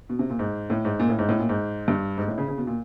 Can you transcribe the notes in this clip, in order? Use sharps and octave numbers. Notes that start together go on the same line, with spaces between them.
B2
C3
A#2
G#2
A2
G#2
A#2
A2
G#2
A2
A#2
G#2
G2
G#2
A2
C#3
C#3
B2
A#2